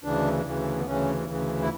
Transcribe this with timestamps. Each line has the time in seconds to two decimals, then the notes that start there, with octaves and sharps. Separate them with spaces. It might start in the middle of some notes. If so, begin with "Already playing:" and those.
0.04 D2 C#3 E3 D4
0.45 D2 C#3 E3
0.78 B3
0.86 D2 C#3 E3 C#4
1.28 D2 C#3 E3
1.62 E4